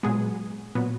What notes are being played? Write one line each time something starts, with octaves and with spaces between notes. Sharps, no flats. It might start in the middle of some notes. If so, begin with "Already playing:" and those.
A#2 F#3 G#3 B3 G#4
A#2 F#3 B3